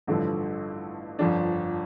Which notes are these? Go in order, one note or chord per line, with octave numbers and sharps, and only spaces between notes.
A1 G2 D3 F3
G1 F2 F3 D4